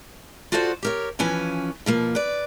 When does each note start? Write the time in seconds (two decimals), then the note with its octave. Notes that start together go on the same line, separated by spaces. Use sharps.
0.52 F4 F#4 A4 C5 D5 F#5
0.83 G4 A#4 C#5
1.19 E3 F3 C#4 B4 G#5
1.86 B2 F3 A#3
2.15 B4 D5